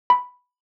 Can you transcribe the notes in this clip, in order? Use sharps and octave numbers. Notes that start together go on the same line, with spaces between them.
B5